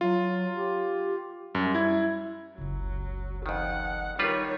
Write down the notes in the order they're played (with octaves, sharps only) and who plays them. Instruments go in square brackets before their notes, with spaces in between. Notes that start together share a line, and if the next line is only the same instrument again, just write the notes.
[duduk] F#3 [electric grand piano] F4
[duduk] G4
[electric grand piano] F#2 [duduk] G3
[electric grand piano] E4 G#6
[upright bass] F#1 C#2 [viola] F#3
[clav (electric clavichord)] F2 D#3 [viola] F#5
[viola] D#3 C#5 [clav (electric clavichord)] G3 F4 B4